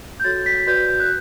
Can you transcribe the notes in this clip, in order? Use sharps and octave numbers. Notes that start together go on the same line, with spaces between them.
G6
F#4 A4 C#5 A6
B6
F#4 B4 D5 G6
F#6